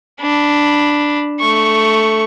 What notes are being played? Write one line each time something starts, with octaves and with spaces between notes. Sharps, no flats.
D4 B5
A3 C#6